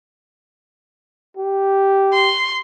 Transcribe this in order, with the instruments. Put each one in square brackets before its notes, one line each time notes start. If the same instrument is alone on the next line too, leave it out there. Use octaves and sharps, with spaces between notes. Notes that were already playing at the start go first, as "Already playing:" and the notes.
[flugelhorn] G4
[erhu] C6